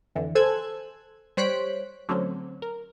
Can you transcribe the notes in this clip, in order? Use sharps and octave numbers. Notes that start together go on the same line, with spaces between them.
F2 D3 E3
A4 C5 G#5 E6 F#6 G#6
G3 C5 C#5 F#6 B6 D7
D3 F#3 A3 C4 C#4
A#4